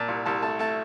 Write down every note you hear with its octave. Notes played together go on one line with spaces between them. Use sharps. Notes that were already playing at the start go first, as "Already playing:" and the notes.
Already playing: A#2 A5
C2
C2 A5
A3 A5
A3 A5